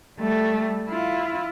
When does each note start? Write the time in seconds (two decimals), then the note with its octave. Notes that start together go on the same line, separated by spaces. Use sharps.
0.19 G3 A3
0.89 E4 F4